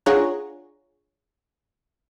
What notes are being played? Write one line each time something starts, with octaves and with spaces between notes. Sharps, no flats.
D4 F4 G#4 C#5 F#5 A#5